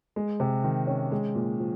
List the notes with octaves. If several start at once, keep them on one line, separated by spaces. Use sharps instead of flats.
G#3
C3
D#3
C#4
G#3
A#2
F3